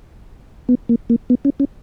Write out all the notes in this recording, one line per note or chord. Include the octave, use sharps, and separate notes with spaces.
B3
A#3
A#3
B3
C#4
C#4